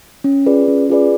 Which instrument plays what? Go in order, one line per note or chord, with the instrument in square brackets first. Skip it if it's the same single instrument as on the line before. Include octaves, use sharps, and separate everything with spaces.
[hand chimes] C#4
F4 G#4 B4 D5
C#4
F4 G#4 B4 D5